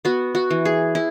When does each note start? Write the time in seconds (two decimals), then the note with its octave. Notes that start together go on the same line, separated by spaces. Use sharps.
0.05 B3 F#4
0.35 F#4
0.51 E3
0.65 G#4
0.95 E4